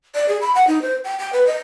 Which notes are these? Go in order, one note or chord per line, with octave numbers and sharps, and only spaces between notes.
D5
G#4
B5
F#5
D#4
C5
G5
G5
B4
D#5